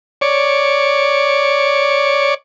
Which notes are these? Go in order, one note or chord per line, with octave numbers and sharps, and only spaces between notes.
C#5 D5